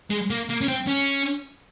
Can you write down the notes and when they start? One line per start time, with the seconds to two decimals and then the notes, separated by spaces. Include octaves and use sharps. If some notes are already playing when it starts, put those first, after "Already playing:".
0.10 G#3
0.30 A#3
0.50 A#3
0.61 C#4
0.68 C4
0.87 C#4